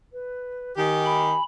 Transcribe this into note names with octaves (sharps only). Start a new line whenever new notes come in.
B4
D#3 G4 G#5
B5